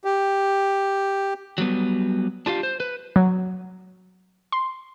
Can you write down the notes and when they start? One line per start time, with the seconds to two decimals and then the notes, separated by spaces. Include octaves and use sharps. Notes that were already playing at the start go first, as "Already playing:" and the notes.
0.05 G4
1.58 F#3 G3 B3
2.46 D4 F4 G4 F5
2.63 C5
2.80 B4
3.16 F#3
4.52 C6